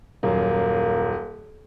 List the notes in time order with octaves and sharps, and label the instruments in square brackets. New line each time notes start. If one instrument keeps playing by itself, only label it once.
[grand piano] D#1 F#2 [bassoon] A#3